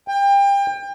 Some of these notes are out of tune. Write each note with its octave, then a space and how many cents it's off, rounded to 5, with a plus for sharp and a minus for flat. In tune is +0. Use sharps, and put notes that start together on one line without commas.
G5 +30